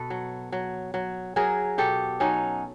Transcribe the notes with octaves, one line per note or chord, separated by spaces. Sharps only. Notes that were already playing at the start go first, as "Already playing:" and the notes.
Already playing: B2 A4 B4
F#3
F#3
F#3
F#3 G#4 A#4
B2 G4 A4
F#3 C#4 D#4